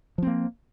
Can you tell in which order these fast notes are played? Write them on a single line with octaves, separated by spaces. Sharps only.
F3 C4 A#3